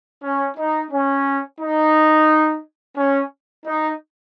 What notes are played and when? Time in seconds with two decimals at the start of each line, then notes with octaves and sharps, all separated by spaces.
0.23 C#4
0.57 D#4
0.92 C#4
1.61 D#4
2.97 C#4
3.66 D#4